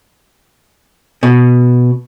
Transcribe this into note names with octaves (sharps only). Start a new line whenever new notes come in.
B2